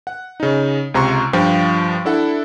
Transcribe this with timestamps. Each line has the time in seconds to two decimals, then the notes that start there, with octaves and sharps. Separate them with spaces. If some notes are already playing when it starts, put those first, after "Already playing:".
0.07 F#5
0.40 C#3 D#4
0.94 C#2 C3 A#5 C6 C#6
1.33 G2 F3 F4 F5 G5
2.05 D4 E4 A4 F#5